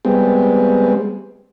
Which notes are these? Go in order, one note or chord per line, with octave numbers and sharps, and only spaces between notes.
G3 G#3 B3 C4